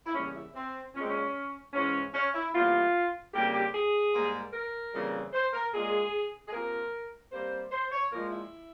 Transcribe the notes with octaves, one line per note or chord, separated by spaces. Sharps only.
E4
E2 C#3 G3 A#3 C#4
E4
C4
A#2 G#3 C4 C#4
C#4
G#2 E3 G#3 C#4
C#4
E4
E2 C3 G3 A#3 F4
F2 C#3 G3 A#3 G4
G4
G#4
G#2 G3 A#3
A#4
F2 C#3 E3 G3 A#3
C5
A#4
A#2 G#3 G#4
G#4
C3 F3 A#3 A#4
C3 G3 A#3 C5
C5
C#5
A#2 F3 G#3 A#4
E4